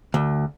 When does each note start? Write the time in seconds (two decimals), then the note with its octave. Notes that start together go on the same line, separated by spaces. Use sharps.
0.14 D2